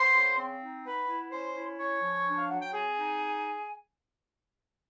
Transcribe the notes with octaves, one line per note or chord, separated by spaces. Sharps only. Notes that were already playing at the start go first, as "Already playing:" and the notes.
Already playing: B3 C5 C6
C#3
C4
D#4
B3 B4 B5
E4
C#4 C5 C6
E4
C#4 C#5 C#6
F3
D4
F5
F#3 F#5
G5
C4 G#4 G#5
D#4